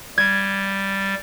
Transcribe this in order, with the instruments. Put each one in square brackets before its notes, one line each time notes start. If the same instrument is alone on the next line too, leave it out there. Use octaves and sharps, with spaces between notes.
[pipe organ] G3 [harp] G#6